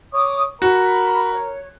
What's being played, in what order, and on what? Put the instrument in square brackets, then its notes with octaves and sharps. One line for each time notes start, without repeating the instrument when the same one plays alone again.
[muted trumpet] C#5 [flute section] D6 D#6
[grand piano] F#4 [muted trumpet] A#4 [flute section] B5
[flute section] C#5